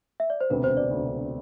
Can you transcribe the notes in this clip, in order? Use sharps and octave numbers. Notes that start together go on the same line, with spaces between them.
E5
D5
C5
E1 D2 C3 B4
C5
D5
E1 D2 C3